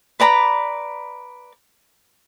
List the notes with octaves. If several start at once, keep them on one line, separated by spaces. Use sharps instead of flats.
B4 D5 A#5 B5